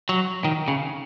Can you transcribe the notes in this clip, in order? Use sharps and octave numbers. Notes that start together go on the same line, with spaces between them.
F#3
D#3
C#3